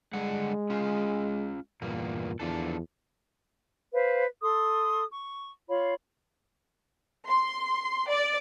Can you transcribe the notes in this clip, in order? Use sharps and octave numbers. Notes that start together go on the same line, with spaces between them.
D3 G3 G#3 F#5
C#4 F4
E2 G2 A#2 A#3
E2 F3 D4 A4
B4 C5 F5
A4 C6 D#6
C#6
F4 C#5 F5 B5
C6
D5